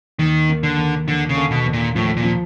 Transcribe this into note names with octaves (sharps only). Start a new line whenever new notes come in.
D#2 D#3
A#3
D3
D#2
D#2 D3
C#3
D3
B2
D#2
A#2
A2 F3
A#2
F3